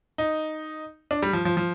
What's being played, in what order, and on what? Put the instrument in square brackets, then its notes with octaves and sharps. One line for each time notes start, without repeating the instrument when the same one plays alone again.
[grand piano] D#4
D4
G3
F3
F3
F3